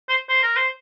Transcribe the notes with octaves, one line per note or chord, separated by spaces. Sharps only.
C5
C5
A#4
C5